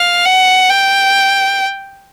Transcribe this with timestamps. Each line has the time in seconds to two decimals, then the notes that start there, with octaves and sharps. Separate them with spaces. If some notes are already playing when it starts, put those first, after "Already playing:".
Already playing: F5
0.26 F#5
0.70 G5